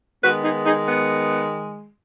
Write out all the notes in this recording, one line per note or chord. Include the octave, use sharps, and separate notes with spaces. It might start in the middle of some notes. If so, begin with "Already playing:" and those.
D#3 G#3 B3 F#4 B4
D#4 G#4
D#4 G#4
B3